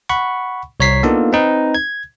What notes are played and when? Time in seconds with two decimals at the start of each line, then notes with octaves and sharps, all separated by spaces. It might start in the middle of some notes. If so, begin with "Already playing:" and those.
0.09 F#5 B5 C#6
0.80 C2 C#5 A#5 B6 C7
1.03 A#3 B3 D4 D#4 F4 A4
1.33 C4 D#4 B4
1.75 G#6